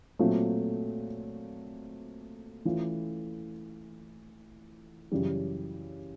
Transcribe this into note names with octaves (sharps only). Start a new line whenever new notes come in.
A#2 F#3 A3 C4 F4
E3 A3 C#4 F4
F#2 C#3 E3 G3